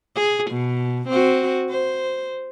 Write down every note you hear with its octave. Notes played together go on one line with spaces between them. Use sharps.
G#4
B2
C4 F#4
C5